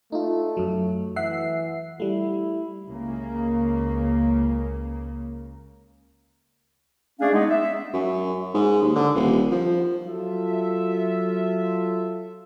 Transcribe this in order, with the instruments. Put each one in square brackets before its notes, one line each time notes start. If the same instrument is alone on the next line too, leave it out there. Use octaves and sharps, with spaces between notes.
[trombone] A3 [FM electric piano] D#4 F4
[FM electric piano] F#2 F#3
[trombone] E3 [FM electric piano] E5 F#5 C7
[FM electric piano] G3 A3 [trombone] E4
[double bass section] C#2 C#3 A#3
[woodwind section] A3 C#4 D4 G#4 D5 F5
G#3 B3 D#4
E5
[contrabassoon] F#2
G#2
D#2
D3
D#1
F3
[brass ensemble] F#3 F4 A4 E5